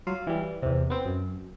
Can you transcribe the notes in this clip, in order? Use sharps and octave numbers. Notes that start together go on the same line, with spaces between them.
F#3 F4 F5
E3 G3
E2 C3
B3 C4
F#2